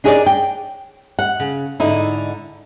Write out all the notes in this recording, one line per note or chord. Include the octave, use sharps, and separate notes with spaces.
D4 D#4 G#4 A#4 C#5 D5
G5
F#5
C#3
G#2 D3 D#4 E4